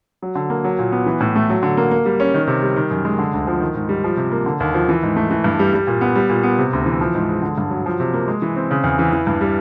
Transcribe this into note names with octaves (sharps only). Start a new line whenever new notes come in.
F#3
D3
A#3
F#3
A#2
B3
E3
A2
A3
F#3
D3
A#3
A#3
G3
C#4
D#3
C3
G3
D#3
F#2
G#3
D3
D2
F3
D#3
G#2
G3
F3
C3
A#3
D3
D#2
F3
E3
G#2
A3
E3
G2
G3
G3
A#2
B3
G3
A#2
B3
C3
D2
E3
F3
G#2
G#3
D3
G2
F#3
F3
C3
A#3
G#3
E3
C4
C#3
E2
E3
E3
G2
G3